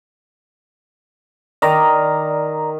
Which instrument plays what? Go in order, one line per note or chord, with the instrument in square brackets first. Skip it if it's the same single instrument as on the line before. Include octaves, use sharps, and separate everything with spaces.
[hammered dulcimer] D#3 [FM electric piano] D5 A#5